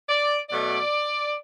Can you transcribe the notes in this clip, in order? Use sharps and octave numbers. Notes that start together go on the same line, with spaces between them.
D5
B2 F#3 A3 D5